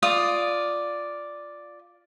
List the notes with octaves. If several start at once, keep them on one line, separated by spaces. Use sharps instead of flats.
F4 D5 D#6